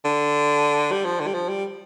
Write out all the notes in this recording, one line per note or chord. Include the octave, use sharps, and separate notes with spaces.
D3
G3
F3
D3
G3
F3
G3